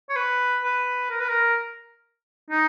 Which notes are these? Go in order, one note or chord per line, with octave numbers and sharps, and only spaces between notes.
C#5
B4
B4
A#4
B4
A#4
D#4